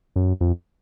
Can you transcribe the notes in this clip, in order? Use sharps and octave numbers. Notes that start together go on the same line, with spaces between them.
F#2
F2